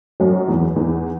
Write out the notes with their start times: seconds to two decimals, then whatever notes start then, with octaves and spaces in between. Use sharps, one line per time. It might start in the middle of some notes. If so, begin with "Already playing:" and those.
0.20 F#2 F#3
0.48 E2 E3
0.76 E2 E3